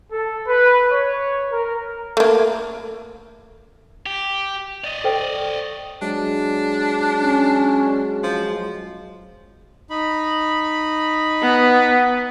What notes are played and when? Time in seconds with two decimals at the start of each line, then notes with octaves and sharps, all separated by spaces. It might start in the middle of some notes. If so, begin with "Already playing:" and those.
0.10 A4
0.46 B4
0.90 C#5
1.51 A#4
2.17 A3 A#3
4.06 G4
4.84 D5 D#5
5.04 A4 C5 G5
6.02 F#3 G#3 D4
7.18 C#4
8.23 F3
9.90 D#4 B5
11.42 B3